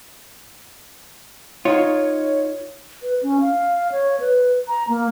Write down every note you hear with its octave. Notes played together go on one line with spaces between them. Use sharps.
D#4 F4 C#5
B4
C#4
F5
C#5
B4
A#5
A#3